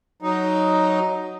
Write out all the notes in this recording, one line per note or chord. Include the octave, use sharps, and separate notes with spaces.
F#3 D#4